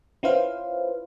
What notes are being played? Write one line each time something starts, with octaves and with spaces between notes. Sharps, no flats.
C#4 E4 F4 B4 C5 F5